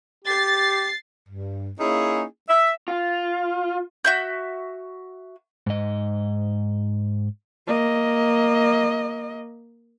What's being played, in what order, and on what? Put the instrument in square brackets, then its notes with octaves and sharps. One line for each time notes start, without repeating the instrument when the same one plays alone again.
[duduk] G4 [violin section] A6 C7
[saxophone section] G2
A#3 C#4 D#4 E4 G#4
E5
[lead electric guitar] F4
[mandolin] F#4 E5 G6
[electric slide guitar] G#2 D#5
[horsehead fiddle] A#3 D#5